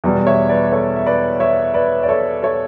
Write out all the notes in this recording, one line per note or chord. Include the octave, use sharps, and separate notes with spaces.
E2 B2 G3
D5
C#5 E5
B4 D5
A4 C#5
E5
B4 D5
C#5 E5
B4 D5
D5
A4 C#5
A4 C#5